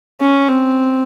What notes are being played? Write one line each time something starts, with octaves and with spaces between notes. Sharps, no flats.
C#4
C4